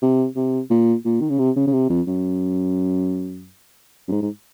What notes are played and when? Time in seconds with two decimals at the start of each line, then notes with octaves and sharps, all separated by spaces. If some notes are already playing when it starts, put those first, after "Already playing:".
0.02 C3
0.36 C3
0.70 A#2
1.05 A#2
1.21 D#3
1.29 C#3
1.39 C3
1.56 C#3
1.67 C#3
1.73 C3
1.89 F2
2.07 F#2
4.08 F#2
4.12 G#2
4.22 G#2